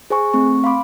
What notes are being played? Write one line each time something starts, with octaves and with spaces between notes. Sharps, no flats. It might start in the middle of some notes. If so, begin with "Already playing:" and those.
G#4 C5 G#5 C#6
A3 C4 C#6
F5 B5 C6 D6